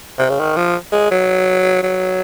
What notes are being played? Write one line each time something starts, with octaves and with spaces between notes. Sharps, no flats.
C3
C#3
D#3
F3
G#3
F#3
F#3